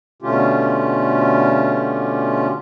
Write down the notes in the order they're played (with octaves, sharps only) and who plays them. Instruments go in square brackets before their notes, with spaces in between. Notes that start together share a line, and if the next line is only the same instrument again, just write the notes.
[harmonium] B2 D3 A3 C#4 F4 G4